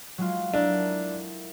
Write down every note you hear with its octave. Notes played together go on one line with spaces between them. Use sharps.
F#3 G#3 F4
D4 E4 A4 A#4